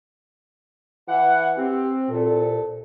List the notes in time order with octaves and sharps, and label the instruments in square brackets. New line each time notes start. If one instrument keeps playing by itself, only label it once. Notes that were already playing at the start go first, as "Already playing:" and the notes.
[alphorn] E3 [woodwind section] F#5
[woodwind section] C4 [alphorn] G4
[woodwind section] C2 A#2 [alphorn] A4